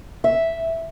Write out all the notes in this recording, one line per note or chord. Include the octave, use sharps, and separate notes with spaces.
E5